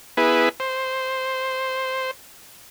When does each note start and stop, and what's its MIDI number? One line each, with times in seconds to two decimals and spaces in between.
0.17 0.49 59
0.17 0.49 64
0.17 0.49 68
0.17 0.49 71
0.60 2.11 72